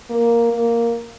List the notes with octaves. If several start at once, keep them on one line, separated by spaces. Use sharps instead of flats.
A#3
A#3